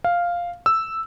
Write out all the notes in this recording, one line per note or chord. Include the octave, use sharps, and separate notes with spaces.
F5
E6